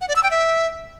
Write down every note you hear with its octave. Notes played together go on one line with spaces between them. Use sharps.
F#5
D5
E6
G5
E5